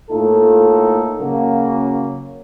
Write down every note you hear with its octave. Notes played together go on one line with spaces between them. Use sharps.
A2 A3 A#3 D#4 F4 A4
C#3 F#3 A#3